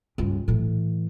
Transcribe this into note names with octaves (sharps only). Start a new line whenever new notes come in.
C#2 G2
A2 E3